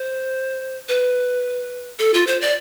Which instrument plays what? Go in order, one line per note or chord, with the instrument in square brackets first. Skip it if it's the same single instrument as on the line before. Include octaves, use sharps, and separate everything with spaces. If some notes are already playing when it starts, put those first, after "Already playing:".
Already playing: [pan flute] C5
B4
A4
F4
C5
D5